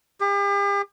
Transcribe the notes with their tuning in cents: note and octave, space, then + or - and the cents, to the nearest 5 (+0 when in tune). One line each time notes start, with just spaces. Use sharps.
G4 +40